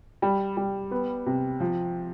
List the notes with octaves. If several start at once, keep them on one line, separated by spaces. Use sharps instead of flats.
G3
G3
B3
C3
F3